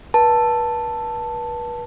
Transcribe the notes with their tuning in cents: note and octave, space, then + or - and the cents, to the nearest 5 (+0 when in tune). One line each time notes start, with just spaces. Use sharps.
B4 -35 A5 +5